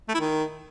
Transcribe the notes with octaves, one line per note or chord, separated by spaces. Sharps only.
A3
E4
D#3